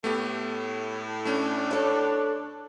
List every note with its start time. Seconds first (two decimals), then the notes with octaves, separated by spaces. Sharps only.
0.04 A2 A3 B3 G4
1.25 A3 C#4 D4
1.71 A4 C#5 D6